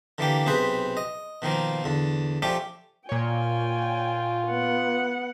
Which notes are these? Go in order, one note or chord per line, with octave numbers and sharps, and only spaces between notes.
D3 E3 A#3 G4
B1 C3 G#4 B4 C5
D#5
B2 D#3 F3 A#3
E2 D3
F3 A3 C#4 G4 D5
A#2 F4 C#5 G5 G#5
B3 F#5